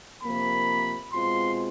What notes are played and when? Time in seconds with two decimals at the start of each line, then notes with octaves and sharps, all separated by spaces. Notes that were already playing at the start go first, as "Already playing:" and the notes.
0.23 C3 F3 A#3 B5
1.12 B2 G#3 C4 F4 C6